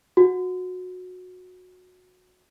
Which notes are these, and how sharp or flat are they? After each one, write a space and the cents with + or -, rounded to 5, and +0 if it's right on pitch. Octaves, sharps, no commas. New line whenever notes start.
F#4 -20